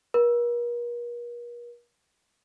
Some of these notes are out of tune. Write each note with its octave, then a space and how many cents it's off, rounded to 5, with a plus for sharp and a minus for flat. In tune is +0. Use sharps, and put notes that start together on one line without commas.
A#4 +45